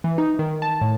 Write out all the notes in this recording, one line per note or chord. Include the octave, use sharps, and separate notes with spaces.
E3
D#4
D#3
A5
A2